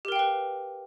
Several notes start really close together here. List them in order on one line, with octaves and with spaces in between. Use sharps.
G4 A#4 G5 F5 B4